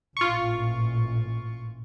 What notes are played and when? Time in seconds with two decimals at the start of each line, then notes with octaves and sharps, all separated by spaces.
0.17 A1 A#2 F4 C#6